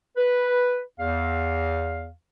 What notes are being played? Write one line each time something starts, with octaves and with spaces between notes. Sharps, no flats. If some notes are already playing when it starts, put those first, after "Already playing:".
B4
E2 F5